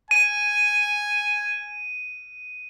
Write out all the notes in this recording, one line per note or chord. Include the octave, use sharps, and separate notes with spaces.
G#5 D#7